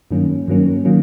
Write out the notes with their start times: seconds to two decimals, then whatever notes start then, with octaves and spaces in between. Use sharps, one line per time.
0.11 G2 D#3 F#3 A#3 C#4
0.48 G2 D#3 F#3 A#3 C#4
0.85 D#3 F#3 A#3 C#4